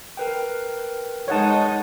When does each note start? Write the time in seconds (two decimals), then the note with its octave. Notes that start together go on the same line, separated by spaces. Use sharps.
0.17 A#4 B4 G5
1.28 G#3 D#4 C#5 F#5 A5